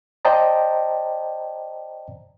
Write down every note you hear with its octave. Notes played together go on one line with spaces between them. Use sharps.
C5 D5 D#5 G5 A5 A#5